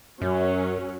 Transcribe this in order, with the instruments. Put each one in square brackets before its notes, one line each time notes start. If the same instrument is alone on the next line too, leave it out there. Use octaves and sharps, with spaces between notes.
[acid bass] F#2 [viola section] F#3 C#4